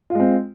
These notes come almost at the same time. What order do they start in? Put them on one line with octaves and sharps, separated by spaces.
F4 G#3 C4